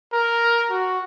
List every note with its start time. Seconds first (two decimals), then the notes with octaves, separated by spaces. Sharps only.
0.13 A#4
0.71 F#4